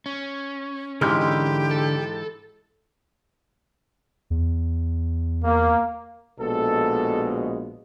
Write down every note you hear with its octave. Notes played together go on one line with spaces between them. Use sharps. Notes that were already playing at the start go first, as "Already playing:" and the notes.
C#4
G#2 D3 E3 G#3 G4 F6 G6
A4
E2
A#3
A#1 B2 G#3 A4